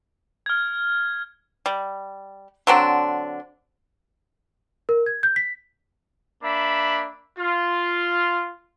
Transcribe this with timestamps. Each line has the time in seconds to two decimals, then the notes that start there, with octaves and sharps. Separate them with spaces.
0.46 F6 G#6
1.66 G3
2.67 D3 F#3 C4 D4
4.89 A#4
5.06 G#6
5.23 G6
5.36 B6
6.43 A#3 D4 E5 B5
7.39 F4